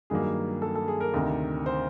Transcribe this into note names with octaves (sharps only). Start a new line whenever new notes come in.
G2 D#3 F#3 A#3 G#4
A4
A4
G#4
A#4
D2 C3 D#3
C5